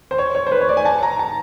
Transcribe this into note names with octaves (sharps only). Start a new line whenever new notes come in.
C5
C#5
C#5
C5
B4
C#5
D5
G#5
A5
A#5
A5